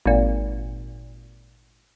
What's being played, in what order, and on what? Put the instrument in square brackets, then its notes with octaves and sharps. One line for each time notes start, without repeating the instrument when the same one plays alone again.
[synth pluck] G#1 A#2